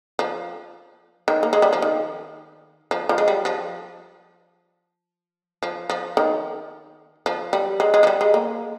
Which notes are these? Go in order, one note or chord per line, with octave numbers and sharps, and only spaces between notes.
F3
D#3
A#3
G#3
G3
F3
D#3
F3
F3
G#3
G3
F3
F3
F3
D#3
F3
G3
G#3
G#3
F3
G3
G#3
A#3